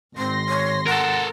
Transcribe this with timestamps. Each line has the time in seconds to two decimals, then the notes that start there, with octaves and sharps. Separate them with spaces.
0.18 G#1 C4 C6 A#6
0.49 C#5
0.87 A4 A#4 F#5